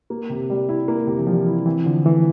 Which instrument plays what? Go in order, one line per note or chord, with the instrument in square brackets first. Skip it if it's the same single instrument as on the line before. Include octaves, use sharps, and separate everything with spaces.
[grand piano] A#3
C3
G3
E4
A#3
C3
[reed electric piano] E3
[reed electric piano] F3 [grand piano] G3
[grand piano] E4
[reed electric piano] E3 [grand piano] C4
[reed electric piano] D3 [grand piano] F3
[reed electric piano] E3 [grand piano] A3